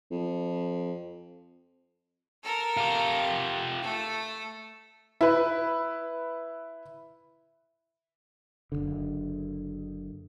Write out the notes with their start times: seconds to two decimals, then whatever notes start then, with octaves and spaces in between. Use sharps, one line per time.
0.11 F2
2.44 A4 A#4
2.77 F4 G4
3.82 A3 A4
5.21 E4 B4
8.72 F#1 B1 D3